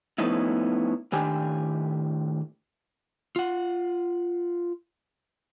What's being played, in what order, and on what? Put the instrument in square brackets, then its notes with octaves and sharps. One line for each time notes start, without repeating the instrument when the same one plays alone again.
[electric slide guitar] F3 A3 B3 C#4 D#4 E4
A2 D#3 D4 G4 G5 G#5
[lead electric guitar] F4 F#5